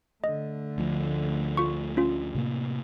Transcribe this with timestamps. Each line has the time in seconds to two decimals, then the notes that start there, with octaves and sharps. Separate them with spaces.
0.24 D3 A3 D#5
0.78 D2 F3
1.57 F4 C#6
1.97 C#4 F4
2.35 A2 C3 A#3